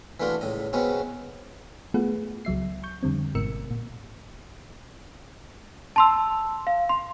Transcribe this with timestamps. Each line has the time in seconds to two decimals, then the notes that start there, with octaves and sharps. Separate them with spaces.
0.20 E3 A3 D4 F4 F#4
0.41 C#2 A2 D#5
0.73 C3 G#3 B3 C#4 F#4
1.94 A3 B3 F4 G#4 B4 F#5
2.45 C#2 F#3 E5 C7
2.83 C#6 G6
3.03 F2 D3 G3 C4
3.35 G#1 G#2 B2 A#4 E6 C#7
3.71 A#2
5.96 A5 C6 E6
6.67 F5
6.89 C6